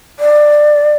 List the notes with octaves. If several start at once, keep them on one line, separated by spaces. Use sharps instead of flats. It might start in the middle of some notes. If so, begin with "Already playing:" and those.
D5